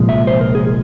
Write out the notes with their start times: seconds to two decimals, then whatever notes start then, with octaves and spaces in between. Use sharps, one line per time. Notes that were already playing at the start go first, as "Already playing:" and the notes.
Already playing: C2 A#2 F3 G#3
0.09 E5
0.27 C5
0.41 A#4
0.55 G#4